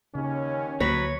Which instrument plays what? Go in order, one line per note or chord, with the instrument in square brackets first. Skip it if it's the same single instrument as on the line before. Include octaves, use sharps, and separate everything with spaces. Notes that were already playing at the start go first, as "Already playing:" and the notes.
[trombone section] D#2 C#4 [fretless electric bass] C#3
[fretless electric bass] D2 A#3 [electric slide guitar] F#3 B4 [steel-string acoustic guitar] C#5